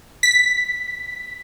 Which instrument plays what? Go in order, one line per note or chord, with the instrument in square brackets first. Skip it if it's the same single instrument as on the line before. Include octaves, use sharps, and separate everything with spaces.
[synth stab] B6